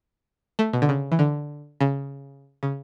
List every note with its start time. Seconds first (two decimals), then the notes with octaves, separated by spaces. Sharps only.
0.59 A3
0.73 B2
0.82 D3
0.89 C#3
1.12 E3
1.19 D3
1.81 C#3
2.63 C#3